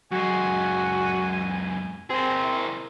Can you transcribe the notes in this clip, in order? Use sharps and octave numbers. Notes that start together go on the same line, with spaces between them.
F#2 G#3 F#4 G#5
A#3 C4 G#4
E4